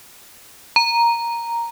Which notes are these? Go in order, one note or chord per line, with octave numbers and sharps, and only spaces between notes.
A#5